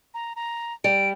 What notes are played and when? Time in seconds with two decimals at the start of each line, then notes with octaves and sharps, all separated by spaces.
0.14 A#5
0.36 A#5
0.84 G3 D7